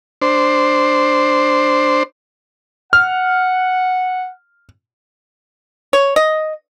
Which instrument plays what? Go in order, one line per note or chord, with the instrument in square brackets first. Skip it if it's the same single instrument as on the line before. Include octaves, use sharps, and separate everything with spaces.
[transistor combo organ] D4 C5
[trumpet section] F#5 [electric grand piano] F6
[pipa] C#5
D#5